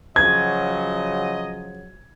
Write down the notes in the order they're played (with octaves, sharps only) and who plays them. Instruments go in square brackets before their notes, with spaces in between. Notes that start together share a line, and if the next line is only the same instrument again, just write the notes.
[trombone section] C#3 F3 F#3 [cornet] D#5 [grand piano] G#6